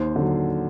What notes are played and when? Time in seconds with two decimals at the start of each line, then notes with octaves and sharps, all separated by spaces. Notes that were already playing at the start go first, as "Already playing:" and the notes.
Already playing: D#2 C5
0.16 D3 F#3